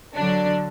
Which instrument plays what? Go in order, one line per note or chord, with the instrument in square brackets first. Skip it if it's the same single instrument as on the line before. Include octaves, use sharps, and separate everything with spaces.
[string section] D3 F#3 D4